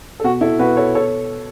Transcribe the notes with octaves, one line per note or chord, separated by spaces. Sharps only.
A4
B2 F#4
E4 A4
B2 F#4 B4
A4 C#5
A4 C#5